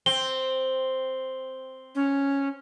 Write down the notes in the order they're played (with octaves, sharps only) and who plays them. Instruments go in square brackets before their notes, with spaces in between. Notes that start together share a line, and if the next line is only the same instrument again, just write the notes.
[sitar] C4 [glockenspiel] G7
[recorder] C#4